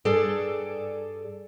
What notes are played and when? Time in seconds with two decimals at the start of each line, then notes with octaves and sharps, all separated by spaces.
0.05 G2 G#4 A4 D5